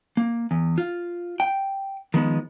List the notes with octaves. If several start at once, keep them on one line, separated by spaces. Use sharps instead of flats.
A#3
E2
F4
G5
D#3 F3 G#3 B3